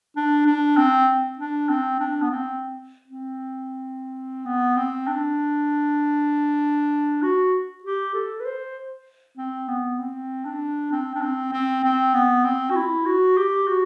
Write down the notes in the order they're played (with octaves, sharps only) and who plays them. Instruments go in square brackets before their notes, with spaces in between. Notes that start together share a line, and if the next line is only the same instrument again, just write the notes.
[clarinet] D4
D4
C4
D4
C4
D4
B3
C4
C4
B3
C4
D4
F#4
G4
A4
B4
C5
C4
B3
C4
D4
C4
D4
C4
C4
C4
B3
C4
F#4
E4
F#4
G4
F#4